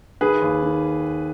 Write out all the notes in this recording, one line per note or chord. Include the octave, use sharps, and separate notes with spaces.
D#3 G#4 B4
D#2
D#3